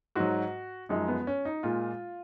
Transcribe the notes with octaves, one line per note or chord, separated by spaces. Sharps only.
G#2 F#3 F#4
F#2 F3 G#3 D#4
B3
C#4
D#4
A#2 G#3 F4